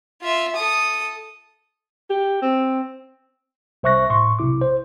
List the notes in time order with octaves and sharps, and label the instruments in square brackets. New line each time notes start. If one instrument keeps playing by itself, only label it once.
[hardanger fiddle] F4 E5
A4 D#6
[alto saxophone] G4
C4
[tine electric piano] C2 C5 E5 C#6 F#6 A#6
A2 C6 C#6
B1 C3 E4 D6
C5